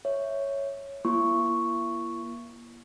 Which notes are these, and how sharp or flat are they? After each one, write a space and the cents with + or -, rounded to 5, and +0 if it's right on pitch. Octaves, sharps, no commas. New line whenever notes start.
C#5 +0 E5 +0
A#3 +40 E4 +40 C#6 +0